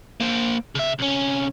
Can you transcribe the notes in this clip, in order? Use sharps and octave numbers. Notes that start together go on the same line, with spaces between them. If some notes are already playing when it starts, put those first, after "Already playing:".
A#3 C5
C#3 E5
C2 C#4